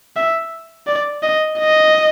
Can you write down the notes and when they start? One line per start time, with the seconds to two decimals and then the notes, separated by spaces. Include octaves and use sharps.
0.16 E5
0.87 D5
1.23 D#5
1.59 D#5